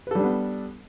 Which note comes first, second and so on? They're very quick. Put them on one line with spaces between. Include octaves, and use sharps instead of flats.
B4 A4 G3 D4 B3